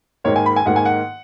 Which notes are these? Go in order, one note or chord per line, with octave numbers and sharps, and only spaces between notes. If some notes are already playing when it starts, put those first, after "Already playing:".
G#2 D#3 A#3 C#5
G#5
B5
G#5
G#2 D#3 A#3 F#5
G#5
F#5